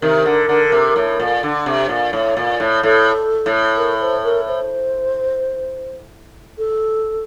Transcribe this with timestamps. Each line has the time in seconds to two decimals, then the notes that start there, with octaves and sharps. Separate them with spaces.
0.02 C3 D#3 A#4
0.26 D3
0.49 D3
0.72 C3
0.96 A2
1.20 A#2
1.43 D3
1.66 C3
1.89 A#2
2.13 A2
2.37 A#2
2.60 A2
2.83 A2 A4
3.46 A2
3.77 A#4
4.01 C5
4.24 A#4
4.48 C5
6.58 A4